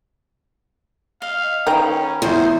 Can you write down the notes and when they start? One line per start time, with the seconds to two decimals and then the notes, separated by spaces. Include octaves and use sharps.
1.22 D#5 F5
1.67 D#3 C#4 B4 G5 A#5 B5
2.22 E2 C5